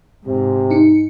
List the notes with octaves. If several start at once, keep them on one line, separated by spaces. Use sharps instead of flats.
G#2 C3
D#4 C#7